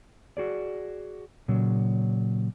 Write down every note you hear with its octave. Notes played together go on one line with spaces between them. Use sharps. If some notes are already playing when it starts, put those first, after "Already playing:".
F#4 G#4 D5
A#2 C#3 F#3